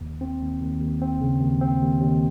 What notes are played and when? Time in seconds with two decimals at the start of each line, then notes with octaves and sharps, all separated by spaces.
0.01 D#2
0.21 C4
0.42 D#2
0.62 D#2
0.81 D#2
1.02 C4
1.21 C#3
1.41 D#2
1.61 C4
1.82 D#2
2.01 D#2